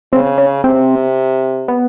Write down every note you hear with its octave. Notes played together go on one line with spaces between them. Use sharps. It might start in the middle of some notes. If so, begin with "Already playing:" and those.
C#3 C4
C#4
C3 C4
B3